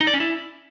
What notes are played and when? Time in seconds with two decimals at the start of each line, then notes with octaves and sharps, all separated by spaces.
0.01 D#4
0.07 D5
0.14 C#4
0.20 E4